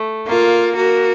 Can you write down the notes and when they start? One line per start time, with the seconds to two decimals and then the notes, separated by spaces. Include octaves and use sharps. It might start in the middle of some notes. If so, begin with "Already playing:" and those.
Already playing: A3
0.27 A#3 F4
0.76 A#3 F#4